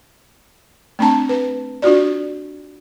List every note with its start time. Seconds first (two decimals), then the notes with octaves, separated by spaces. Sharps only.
0.99 A3 C4 D4 A5 A#5
1.29 B4
1.82 D4 F4 F#4 D5